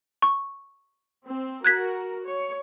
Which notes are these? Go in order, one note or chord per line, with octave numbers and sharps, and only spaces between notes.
C#6
C4
F#4 A#4 F#6 G#6 B6
C#5